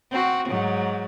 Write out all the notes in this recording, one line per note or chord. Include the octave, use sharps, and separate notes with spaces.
C4 F#4
G#2 F#3